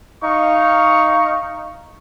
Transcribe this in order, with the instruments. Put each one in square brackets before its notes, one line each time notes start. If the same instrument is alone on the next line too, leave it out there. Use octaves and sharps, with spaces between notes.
[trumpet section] D#4 F5 C#6